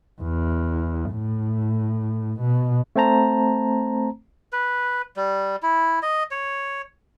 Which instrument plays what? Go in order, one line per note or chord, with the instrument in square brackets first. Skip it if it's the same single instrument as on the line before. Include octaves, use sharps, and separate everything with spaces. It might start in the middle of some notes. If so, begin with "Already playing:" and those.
[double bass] E2
A2
B2
[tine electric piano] A3 C4 C5 A5 A#5
[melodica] B4
G3
E4
D#5
C#5